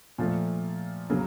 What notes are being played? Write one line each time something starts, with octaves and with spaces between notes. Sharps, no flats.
A#2 F3 A3
C#3 F#3 A#3